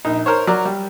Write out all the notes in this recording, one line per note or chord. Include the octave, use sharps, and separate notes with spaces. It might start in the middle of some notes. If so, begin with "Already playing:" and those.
A#1 D#4
A#4 C5 C#5
F#3 A#4 D5
G3